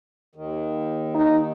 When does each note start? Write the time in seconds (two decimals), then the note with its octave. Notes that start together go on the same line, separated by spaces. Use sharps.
0.35 D#2 D#3
1.14 D#4